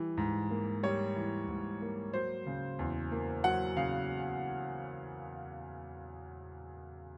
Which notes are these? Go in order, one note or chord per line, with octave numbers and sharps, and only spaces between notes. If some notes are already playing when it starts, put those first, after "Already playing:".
Already playing: E3 G3
G#2
A#3
G3 C#5
E3
G#2
A#3
F#3 C5
C#3
E2
A#3
F#3 F#5
C#3 F5